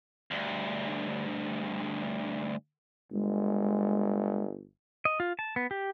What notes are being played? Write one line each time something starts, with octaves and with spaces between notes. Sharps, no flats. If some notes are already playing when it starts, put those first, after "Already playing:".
D2 G2
G1 G#3
D#5
F4
A5
B3
G4